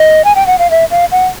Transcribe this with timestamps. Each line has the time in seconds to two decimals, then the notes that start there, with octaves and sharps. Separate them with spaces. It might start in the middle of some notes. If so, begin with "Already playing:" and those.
Already playing: D#5
0.25 G#5
0.35 G5
0.47 F#5
0.59 F5
0.71 E5
0.91 F5
1.12 F#5